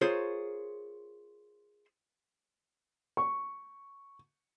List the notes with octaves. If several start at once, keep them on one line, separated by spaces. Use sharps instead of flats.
F4 G#4 A#4 C5 C#5
C#6